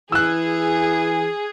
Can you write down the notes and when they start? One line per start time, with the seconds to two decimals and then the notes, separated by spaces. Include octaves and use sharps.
0.12 E3 G#4 E6 F#6